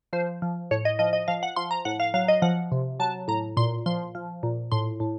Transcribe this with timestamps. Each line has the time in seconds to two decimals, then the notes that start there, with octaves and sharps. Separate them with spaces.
0.13 F3 C5
0.42 F3
0.71 A2 C#5
0.85 D#5
0.99 F3 D#5
1.13 D#5
1.28 F3 F5
1.43 F#5
1.56 F3 C6
1.71 A#5
1.85 A2 F#5
2.00 F5
2.14 F#3 F5
2.28 D#5
2.42 F3 F#5
2.72 C3
3.00 F#3 A5
3.28 A2 A#5
3.57 A#2 C6
3.86 F3 C6
4.15 F3
4.43 A#2
4.72 A2 C6
5.00 A2